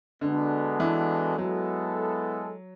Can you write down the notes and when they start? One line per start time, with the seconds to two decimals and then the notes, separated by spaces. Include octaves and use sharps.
0.21 D3 G#3 B3 D4 F#4 A4
0.80 E3
1.38 F#3 G#3 B3 E4 A4